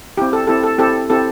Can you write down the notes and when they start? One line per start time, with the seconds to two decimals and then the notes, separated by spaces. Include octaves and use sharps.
0.17 C4 E4 G4
0.33 A4
0.47 C4 E4 G4 A4
0.63 A4
0.78 C4 E4 G4 A4
1.10 C4 E4 G4 A4